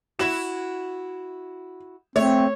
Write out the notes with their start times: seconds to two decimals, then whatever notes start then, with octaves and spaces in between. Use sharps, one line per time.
0.19 E4 F#4 E7
2.16 A3 C4 C#5